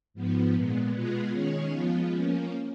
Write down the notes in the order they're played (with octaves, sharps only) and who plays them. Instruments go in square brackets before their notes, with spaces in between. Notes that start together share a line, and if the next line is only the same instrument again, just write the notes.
[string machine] G#2 F3 B3
A#2 G#3 B3
B2 G#3 B3 F4 G#4
D#3 G#3 C#4 G#4 C#5
F3 G#3 B3 F4
F3 A#3 C#4